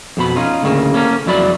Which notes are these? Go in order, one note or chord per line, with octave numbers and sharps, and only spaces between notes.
F2 B2 B5
C#4 D#4 F4
D2 A2 C#3 A#3
A#3 C#4 A4 A#5
C2 F2 F#3 E4 D5 B5